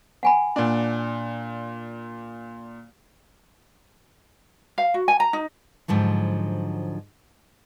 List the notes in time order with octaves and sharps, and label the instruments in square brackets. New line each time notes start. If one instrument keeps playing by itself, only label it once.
[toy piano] F#5 G#5 B5
[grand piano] A#2 D4
[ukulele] F5
F#4
G#5
A#5
D#4
[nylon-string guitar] G#2 D3 F3 F#3